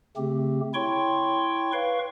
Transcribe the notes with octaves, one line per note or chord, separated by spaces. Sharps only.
C#3 A3 C4 G4
E4 C#5 G5 C6 C#6
B4 F5 C#6